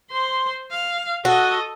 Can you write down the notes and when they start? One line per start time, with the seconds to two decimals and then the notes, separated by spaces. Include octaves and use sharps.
0.11 C5 C6
0.71 F5
1.25 F#4 A4 D#5